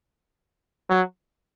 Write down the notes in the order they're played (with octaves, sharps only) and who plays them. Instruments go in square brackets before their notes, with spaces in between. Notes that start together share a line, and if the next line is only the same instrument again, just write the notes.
[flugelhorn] F#3